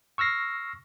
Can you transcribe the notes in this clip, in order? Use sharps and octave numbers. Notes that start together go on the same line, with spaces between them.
C#6 E6 F6 A#6 C7